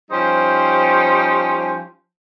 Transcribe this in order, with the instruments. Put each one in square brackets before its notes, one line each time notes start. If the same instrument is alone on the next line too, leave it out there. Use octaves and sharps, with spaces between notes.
[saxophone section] F3 G3 C#4 D#4 G4 C5